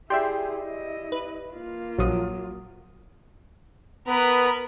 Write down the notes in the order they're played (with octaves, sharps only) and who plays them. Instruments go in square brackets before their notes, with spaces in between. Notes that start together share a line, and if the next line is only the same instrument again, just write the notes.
[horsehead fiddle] E4 G#4 [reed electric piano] G4 D5 E5 [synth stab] G5 C6
[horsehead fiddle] E4 D#5
[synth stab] B4
[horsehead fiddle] A#3 F4
[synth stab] A#1 F3 [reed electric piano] F#3 D#6
[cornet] B3 [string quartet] A#4 B4